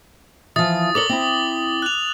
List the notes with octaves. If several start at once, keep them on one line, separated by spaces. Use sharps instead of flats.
E3 F3 D#6 A6
A4 A#4 C#5 D6 F#7 G7
C4 E4
F#6 F7